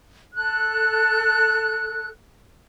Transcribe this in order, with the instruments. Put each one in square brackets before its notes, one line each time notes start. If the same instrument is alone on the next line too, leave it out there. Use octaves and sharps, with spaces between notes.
[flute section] A4 F#6